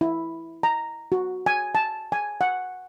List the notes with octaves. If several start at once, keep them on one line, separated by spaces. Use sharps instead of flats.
E4
A#5
F#4
G#5
A5
G#5
F#5